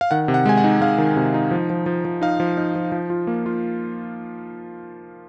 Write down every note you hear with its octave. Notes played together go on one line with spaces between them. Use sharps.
F5
D#3 F#5
C3
F#5
G#3 G#5
F#5
D#4
G#3 F5
D#3
C3
D#4
F3
F3
F3
F3
D#4 F5
F3
D#4
F3
F3
F4
A#3
F4